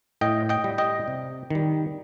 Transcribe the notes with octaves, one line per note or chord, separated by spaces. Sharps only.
A2 D#5 G5
D#5 G5
G3
D#5 G5
C3
D#3 G3